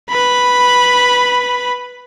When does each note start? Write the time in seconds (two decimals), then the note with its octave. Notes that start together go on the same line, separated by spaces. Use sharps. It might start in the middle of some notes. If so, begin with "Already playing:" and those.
0.10 B4 B5